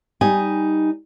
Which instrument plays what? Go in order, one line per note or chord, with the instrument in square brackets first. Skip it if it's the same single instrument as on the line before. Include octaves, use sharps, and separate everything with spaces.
[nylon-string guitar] G3 D#4 G#5